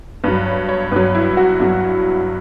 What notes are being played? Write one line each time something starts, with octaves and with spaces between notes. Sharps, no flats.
G2 F#3 B4
C#5
C#5
G2 F#3 B4
E4
F#4
G2 F#3